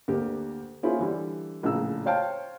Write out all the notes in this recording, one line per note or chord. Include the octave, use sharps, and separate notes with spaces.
D2 A#3 G4
A#3 C#4 E4 F4 G#4 C5
D3 E3 G3
A#1 A2 C#3 E6
C5 C#5 F5 G5 A5